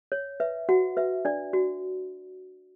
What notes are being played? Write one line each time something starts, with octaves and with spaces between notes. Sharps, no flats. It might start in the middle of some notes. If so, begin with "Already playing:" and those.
C#5
B4 E5
F#4 F#5
B4 E5
D4 D5
F#4